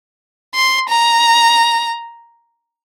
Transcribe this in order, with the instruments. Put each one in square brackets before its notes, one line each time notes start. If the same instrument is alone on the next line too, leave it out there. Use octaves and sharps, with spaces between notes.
[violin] C6
A#5